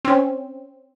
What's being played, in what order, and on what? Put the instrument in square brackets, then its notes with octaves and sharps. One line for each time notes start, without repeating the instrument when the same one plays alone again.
[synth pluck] C4 C#4